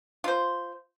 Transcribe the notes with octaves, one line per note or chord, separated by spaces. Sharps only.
F4 C5